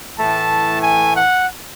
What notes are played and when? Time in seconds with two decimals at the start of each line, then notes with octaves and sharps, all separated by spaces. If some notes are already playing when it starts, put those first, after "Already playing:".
0.16 A2 E3 A3 A5
0.82 G#5
1.16 F#5